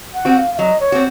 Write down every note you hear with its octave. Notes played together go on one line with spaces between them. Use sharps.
F#5
C4 F#4
F5
F5
F#3 D#5
C#5
C4 F#4